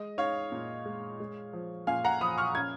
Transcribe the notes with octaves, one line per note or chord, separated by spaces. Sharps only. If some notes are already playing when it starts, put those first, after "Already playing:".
Already playing: G#3 D#5
D#4 C#5 F5
A#2
G#3
G#3
F3
A#2 F5 G#5
F#5 A#5
F3 B5 D#6
C#6 F6
C#4 G#6